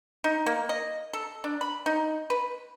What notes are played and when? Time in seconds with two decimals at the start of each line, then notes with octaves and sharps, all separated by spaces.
0.24 D#4
0.46 A#3
0.69 D#5
1.13 A4
1.44 D4
1.61 B5
1.86 D#4
2.30 B4